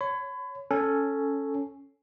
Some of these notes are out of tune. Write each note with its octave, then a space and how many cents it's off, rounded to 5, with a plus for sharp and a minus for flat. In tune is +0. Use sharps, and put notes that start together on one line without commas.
C#5 +0 B5 +35
C#4 +0 A4 +0